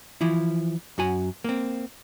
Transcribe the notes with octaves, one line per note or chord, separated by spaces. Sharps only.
E3 F3 E4
F#2 F#4 G#5
A#3 C4